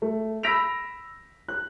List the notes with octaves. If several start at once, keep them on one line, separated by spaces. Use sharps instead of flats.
A3
B5 E6 A#6 B6 D7 F7
F#6